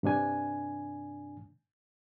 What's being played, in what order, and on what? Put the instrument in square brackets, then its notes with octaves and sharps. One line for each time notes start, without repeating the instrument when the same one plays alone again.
[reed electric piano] G2 C3 D4 G#5